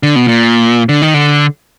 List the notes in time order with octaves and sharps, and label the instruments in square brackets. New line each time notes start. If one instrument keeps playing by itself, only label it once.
[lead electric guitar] D3
B2
A#2
D3
D#3
D3